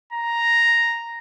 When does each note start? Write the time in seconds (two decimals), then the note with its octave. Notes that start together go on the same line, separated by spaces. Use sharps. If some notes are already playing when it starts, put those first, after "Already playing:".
0.13 A#5